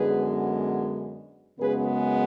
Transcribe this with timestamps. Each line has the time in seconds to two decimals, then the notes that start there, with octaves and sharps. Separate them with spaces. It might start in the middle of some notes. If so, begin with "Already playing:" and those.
Already playing: F#2 D3 G#3 B3 G#4 B4
1.58 F#2 C#3 G#3 B3 G#4 B4